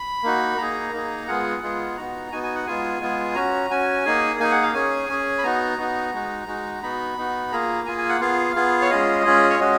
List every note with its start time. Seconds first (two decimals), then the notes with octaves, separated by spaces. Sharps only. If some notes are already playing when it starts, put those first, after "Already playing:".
Already playing: B5
0.23 A#3 D#4 F#4
0.58 A#3 D#4 G#4 A#5
0.93 A#3 D#4 G#4
1.27 G#3 B3 F4 G#4 F#5
1.62 G#3 B3 F4 G#4
1.97 B3 D#4 F#4 A#5
2.32 B3 D#4 F#4 G#5
2.43 G#5
2.55 F#5
2.66 G#3 B3 F4 G#4 G#5
3.00 G#3 B3 F4 G#4
3.35 C#4 F#4 A#5
3.70 C#4 F#4 G#5
4.05 A#3 D#4 G#4
4.39 A#3 D#4 G#4 G#5
4.52 F#5
4.62 F5
4.74 C#4 G#4 G#5
5.09 C#4 G#4
5.38 B5
5.43 B3 D#4 F#4 A#5
5.78 B3 D#4 F#4
6.13 G#3 D#4 F#4
6.47 G#3 D#4 F#4
6.82 B3 D#4 F#4 B5
7.18 B3 D#4 F#4
7.52 A#3 F4 G#4 A#5
7.86 A#3 F4 G#4 G#5
7.98 G#5
8.09 F#5
8.21 B3 F4 G#4 F5
8.56 B3 F4 G#4
8.82 C#5
8.90 G#3 C#4 F4 G#4 D#5
9.24 G#3 C#4 F4 G#4
9.50 C#5
9.60 G#3 C#4 F#4 D#5